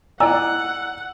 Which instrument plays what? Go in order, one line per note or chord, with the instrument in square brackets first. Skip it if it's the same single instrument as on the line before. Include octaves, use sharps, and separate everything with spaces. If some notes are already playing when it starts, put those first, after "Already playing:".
[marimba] E4 A#5 [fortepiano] D5 D#5 G#5 [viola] F#5 [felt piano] E6